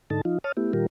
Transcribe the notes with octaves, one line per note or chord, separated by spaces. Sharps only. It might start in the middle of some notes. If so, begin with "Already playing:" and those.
G#2 D3 D#4 A4 A5
F3 D#4 F4
C#5 A5 D#6 F6
A3 B3 E4 G4
A#2 D#3 G3 F4 G4 A#4